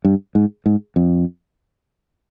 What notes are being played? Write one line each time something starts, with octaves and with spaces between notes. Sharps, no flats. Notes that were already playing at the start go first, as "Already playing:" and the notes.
G2
G#2
G#2
F2